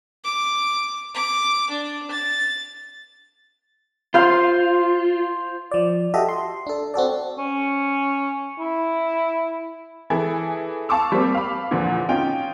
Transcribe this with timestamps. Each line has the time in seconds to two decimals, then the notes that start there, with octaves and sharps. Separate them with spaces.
0.24 D6
1.15 D6
1.71 D4
2.11 A6
4.14 F4 C5 F5 C6
5.71 F3 D5
6.14 F#4 G4 A4 D#5 E5
6.29 C6
6.67 D4 A4
6.94 C4 F#4 A4 D5
7.38 C#4
8.59 E4
10.10 E3 E4 G#4 A4
10.89 F5 A5 C#6 D6 E6
11.12 G3 A#3 C4
11.34 F5 B5
11.71 E2 A#2 D3 F3
12.09 C#4 D#4 F4 G5